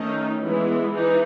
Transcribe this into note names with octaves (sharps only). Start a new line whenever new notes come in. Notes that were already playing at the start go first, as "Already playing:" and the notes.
Already playing: D#3 A3 C#4 D#4
E3 G#3 B3 E4
E3 D#4